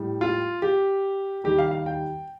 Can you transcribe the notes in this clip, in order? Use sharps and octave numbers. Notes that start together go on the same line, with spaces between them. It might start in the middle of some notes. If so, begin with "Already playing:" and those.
Already playing: A2 G3
F4
G4
D#2 D#3 G3 G4
F5
F5
G5